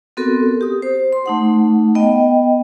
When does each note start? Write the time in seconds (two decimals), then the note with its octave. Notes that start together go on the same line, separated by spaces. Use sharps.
0.17 B3 C4 F#4 A4 A#4
0.61 G4 D#6
0.82 C5
1.13 C6
1.26 A3 D#4 F#5
1.95 B3 D#5 G5